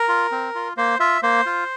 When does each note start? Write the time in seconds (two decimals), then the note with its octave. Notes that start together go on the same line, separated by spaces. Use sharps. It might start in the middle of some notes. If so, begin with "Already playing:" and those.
Already playing: A#4
0.09 F4
0.32 C4
0.55 F4
0.77 A#3 C5
1.00 F4 E5
1.23 A#3 C5
1.46 F4